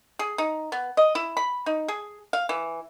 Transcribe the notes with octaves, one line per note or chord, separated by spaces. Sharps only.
G#4
D#4
B3
D#5
E4
B5
D#4
G#4
F5
E3